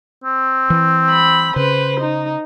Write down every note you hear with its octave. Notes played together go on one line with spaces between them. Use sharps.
C4
E3
B5
C#3 B4 C5
D#4